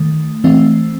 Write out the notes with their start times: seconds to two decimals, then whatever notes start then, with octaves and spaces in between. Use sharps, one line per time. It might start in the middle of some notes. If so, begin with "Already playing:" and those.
Already playing: D#3 A3
0.44 E3 A3 C4